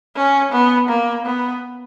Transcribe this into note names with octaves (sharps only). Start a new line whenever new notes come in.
C#4
B3
A#3
B3